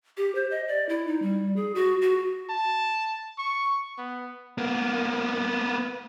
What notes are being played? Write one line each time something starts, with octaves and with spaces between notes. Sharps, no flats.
G4
C5
D#5
D5
E4
D#4
G3
G#4
F#4
F#4
A5
C#6
B3
A#3 B3